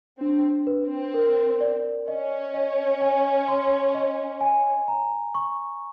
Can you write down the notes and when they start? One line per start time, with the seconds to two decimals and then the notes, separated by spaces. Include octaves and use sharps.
0.21 C4 D4
0.67 B4
0.83 C4
1.14 A#4
1.61 D5
2.08 C#4 D#5
2.54 D#5
3.01 G#5
3.48 C6
3.95 D#5
4.41 G#5
4.88 A#5
5.35 C#6